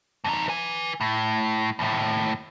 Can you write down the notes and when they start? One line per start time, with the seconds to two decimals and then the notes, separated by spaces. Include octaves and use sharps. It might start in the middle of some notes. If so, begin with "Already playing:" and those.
0.24 F2 D#4
0.48 B4 G#5
1.01 A2
1.79 D#2 A2